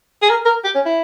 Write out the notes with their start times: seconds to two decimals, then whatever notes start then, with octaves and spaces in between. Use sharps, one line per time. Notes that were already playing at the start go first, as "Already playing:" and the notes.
0.22 G#4
0.30 A#4
0.45 A#4
0.64 G4
0.75 C#4
0.86 E4